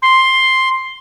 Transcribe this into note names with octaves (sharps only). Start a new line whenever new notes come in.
C6